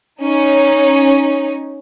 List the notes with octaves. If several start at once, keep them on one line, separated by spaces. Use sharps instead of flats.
C#4 D#4